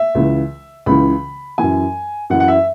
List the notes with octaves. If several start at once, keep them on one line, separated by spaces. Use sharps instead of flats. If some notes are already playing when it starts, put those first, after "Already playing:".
Already playing: E5
C#2 C#3 E3
C#2 C#3 E3 B5
F#2 E3 G#5
F#2 E3 F#5
F#5
E5